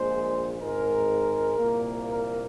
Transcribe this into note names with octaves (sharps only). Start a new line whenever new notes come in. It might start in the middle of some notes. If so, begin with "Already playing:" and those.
Already playing: A#1 A#2 G#3 C5
G#1 G#2 G#3 A#4
C2 A#2 A#3
A#4